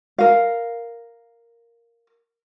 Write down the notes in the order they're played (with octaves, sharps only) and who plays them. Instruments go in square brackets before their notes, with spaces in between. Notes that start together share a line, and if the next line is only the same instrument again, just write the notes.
[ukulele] A#4 F5